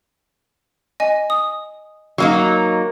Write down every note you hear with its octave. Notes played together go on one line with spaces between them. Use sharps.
D#5 G#5
D#6
F#3 A#3 D#4